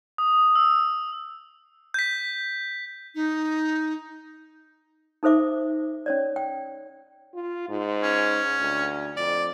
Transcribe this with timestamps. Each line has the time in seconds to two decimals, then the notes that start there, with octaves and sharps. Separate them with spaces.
0.18 D#6
0.55 E6
1.94 G6 B6
3.15 D#4
5.23 D#4 A4 C5 E5 D6
6.06 C#4 C#5 D5
6.36 G5
7.34 F4
7.69 G#2
8.03 C#4
8.61 D2
9.17 F2 D5